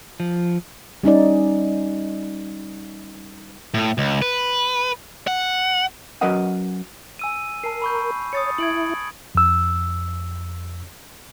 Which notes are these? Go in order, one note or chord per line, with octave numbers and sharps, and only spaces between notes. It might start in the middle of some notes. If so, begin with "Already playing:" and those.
F3
G3 C#4 D#4 D5
A2
C#2
B4
F#5
F#3 C#4 A#4 B4 D#5 F#5
G#5 E6 D#7
A#4 A5 C7
B5 C#6 G6
C#5 D#6 A6 C#7
E4 G#6 D7 F#7
F2 E6